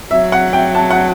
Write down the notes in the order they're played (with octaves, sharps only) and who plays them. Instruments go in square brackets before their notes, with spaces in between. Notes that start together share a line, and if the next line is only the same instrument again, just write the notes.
[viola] F#3 [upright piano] E5
[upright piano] F#5
G5
A5
F#5